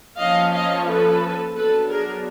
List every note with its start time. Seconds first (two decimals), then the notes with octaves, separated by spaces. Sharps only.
0.19 F3 A#3 C#4 D#5 F5
0.53 D#5 F5
0.87 A4 B4
1.55 F#3 B3 D4 A4 B4
1.89 G#4 A#4